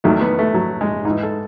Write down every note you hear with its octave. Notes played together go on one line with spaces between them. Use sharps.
E2 D#3 F#3 A3
B3
A3
F#3
G#3
G#2 D#4
E3
A4